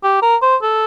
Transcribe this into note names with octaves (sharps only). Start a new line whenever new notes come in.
G4
A#4
C5
A4